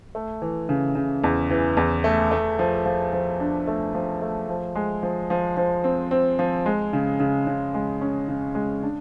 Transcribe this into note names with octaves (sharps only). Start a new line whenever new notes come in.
A3
E3
C#3
C#3
E2
E3
E2
A3
A3
F3
F3
F3
D4
A3
F3
A3
F3
G#3
F3
F3
F3
C4
C4
F3
G#3
C#3
C#3
C#3
G#3
C#4
C#3
G#3
D4